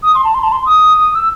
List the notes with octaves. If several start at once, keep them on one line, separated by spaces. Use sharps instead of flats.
D#6
C6
A5
C6
A5
C6
D#6
D#6
E6